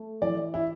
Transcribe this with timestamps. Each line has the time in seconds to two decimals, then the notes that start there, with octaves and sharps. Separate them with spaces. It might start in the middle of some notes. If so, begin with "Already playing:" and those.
Already playing: A3
0.22 E3 D5
0.54 E4